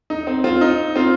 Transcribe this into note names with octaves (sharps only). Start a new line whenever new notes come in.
D#4
C4
C4 F4
D#4
C4 F4